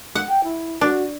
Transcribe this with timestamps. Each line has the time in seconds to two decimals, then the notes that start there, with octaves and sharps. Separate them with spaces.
0.15 F#5
0.28 G5
0.44 E4
0.81 D4 F#4